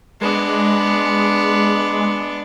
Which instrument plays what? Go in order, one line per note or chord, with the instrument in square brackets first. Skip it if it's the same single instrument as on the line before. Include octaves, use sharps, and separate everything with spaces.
[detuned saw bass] G#3 [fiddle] B3 D4